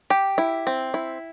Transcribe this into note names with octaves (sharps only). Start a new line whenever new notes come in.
G4
E4
C4
E4